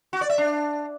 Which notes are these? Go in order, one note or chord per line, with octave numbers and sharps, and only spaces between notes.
F#4
D5
E5
D4